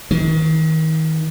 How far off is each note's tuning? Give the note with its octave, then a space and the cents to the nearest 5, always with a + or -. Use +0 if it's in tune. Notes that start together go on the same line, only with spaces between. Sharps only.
D#3 +35